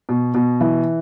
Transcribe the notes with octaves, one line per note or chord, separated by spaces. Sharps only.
B2
B2
E3